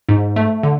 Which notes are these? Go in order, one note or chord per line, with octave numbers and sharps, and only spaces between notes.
G#2
A3
D3